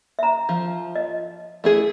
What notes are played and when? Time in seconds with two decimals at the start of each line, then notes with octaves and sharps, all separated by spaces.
0.19 E5 A#5
0.49 F3
0.96 D#5
1.64 A3 E4 G#4